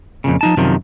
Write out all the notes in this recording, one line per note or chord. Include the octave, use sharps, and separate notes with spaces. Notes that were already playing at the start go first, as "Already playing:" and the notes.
F2 A#2 C#3
F3 D#4 A5
F#2 C3 D#3 F3